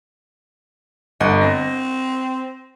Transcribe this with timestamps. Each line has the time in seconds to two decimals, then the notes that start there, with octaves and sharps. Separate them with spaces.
1.20 G1 D#5 F#5
1.41 C4 A#6